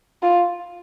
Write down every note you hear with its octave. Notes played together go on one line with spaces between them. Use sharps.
F4